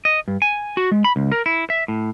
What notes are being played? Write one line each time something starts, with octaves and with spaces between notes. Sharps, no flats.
D#5
G2
G#5
F#4
G#3
B5
C#2
A#4
E4
E5
A2